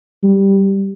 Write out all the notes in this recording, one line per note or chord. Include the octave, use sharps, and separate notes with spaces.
G3